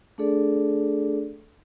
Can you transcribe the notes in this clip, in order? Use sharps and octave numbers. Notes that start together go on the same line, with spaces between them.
A3 D4 G#4 A4 D5